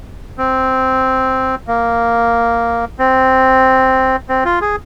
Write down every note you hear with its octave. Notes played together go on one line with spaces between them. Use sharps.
C4
A#3
C4
C4
F4
G#4